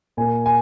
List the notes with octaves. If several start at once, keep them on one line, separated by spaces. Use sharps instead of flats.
A#2 A#3 G#5
G#5